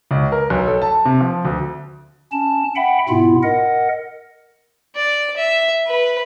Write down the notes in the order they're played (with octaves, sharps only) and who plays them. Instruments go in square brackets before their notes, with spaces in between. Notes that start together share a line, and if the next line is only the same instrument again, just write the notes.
[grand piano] C#2
A#4
B1
A4
A5
C3
F3
D2
[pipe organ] C#4 A5
E5 F#5 G5 B5
G#2 B2 B3 E4 F4
A#4 D#5 F#5
[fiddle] D5
E5
B4